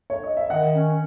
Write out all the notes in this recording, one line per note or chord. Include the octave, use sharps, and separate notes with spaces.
C#5
D#5
E5
D#3 D#5 F#5
C#4